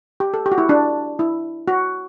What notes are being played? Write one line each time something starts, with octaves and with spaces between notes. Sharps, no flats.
G4
A4
G4
F#4
E4
D4
E4
F#4